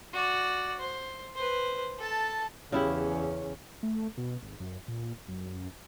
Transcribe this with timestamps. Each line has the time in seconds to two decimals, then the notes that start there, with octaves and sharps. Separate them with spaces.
0.13 F#4 D5
0.79 C5
1.36 B4 C5
1.99 A4 A5
2.72 E2 C#3 C#4 E4 G4
3.83 A3
4.17 B2
4.42 G#1
4.60 F#2
4.88 A#2
5.28 F#2